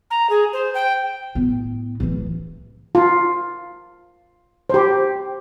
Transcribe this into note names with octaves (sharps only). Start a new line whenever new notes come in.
A#5
G#4
C5
G5
A2 B3
D1 E3
F4
G4 C5